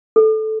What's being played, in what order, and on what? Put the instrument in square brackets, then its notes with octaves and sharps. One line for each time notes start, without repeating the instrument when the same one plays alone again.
[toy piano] A4